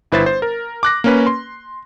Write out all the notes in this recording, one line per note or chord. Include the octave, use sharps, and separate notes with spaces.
G1 E4 B4 C5 E5 A6
C5
A#4
D6 F#6 A#6
A#3 C#4 B4
C6